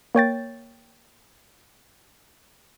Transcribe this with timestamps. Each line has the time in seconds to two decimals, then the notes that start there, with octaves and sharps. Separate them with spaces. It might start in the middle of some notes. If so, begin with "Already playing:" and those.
0.15 A#3 C#5 G5 A6